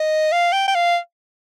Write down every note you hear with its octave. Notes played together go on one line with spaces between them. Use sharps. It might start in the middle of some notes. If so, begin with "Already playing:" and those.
Already playing: D#5
F5
G5
G5
F5